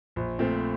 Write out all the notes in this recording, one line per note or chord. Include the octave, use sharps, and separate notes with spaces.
A#1
A#2 A3 C4